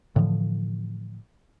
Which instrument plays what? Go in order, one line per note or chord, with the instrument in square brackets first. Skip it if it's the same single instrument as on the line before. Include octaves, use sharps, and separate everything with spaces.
[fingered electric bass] A2 D3 E3 F3